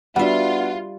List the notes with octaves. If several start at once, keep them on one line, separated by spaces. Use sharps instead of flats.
G3 B3 D4 F4 F#4 E5 F#5